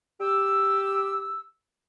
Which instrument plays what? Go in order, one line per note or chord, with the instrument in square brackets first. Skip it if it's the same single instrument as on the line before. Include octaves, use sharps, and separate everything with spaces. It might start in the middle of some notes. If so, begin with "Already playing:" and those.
[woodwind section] G4 E6